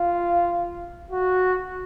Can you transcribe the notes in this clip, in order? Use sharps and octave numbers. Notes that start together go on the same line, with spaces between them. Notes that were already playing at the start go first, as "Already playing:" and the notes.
Already playing: F4
F#4